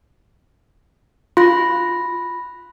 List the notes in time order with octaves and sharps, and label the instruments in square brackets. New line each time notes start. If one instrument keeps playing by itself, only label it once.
[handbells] F4 [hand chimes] B5 F#6 A#6